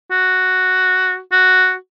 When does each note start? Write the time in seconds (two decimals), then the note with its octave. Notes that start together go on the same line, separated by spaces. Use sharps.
0.11 F#4
1.32 F#4